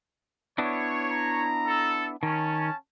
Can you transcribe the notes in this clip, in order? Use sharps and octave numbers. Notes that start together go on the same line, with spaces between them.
B3 D4 E4 C#5
A#5
A4
D#3 C#4 A5